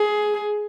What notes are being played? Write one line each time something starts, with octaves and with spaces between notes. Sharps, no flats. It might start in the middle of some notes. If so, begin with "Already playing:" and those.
Already playing: G#4